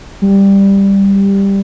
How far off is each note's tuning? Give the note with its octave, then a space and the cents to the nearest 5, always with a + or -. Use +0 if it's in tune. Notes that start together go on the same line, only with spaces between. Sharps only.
G3 +10